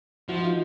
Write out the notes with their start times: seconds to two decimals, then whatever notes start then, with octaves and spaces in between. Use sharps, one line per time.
0.29 F3 E4 F#4
0.43 D#4 F4